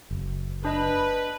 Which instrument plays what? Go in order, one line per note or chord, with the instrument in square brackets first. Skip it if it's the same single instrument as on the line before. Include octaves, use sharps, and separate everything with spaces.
[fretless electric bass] F#1
[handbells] D4 D#5 [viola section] B4